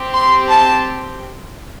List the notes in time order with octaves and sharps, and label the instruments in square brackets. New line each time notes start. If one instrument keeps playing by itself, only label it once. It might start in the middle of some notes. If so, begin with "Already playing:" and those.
Already playing: [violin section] C4 G4
C6
A5